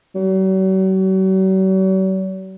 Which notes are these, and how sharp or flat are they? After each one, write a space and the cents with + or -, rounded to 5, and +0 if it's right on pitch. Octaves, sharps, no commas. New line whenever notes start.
F#3 +45